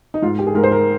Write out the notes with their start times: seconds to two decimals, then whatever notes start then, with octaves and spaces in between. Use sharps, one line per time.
0.14 D#4
0.22 G#2 F4
0.39 G4
0.47 G#4
0.55 G#2 A#4
0.64 C5
0.71 A#4